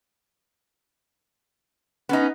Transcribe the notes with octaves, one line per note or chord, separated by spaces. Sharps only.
B3 C#4 D#4